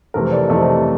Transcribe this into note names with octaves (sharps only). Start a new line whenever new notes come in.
F2 C3 E3 A3 C4 A#4
D5
F2 C3 E3 A3 C4 D#5